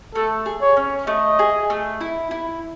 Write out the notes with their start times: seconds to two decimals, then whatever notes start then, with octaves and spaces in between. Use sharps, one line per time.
0.15 A3 A4
0.46 G#4
0.62 C#5
0.77 C#4
1.07 A3 D#5
1.39 G#4
1.70 A3
2.01 E4
2.31 E4